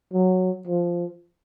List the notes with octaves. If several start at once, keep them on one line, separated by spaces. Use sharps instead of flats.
F#3
F3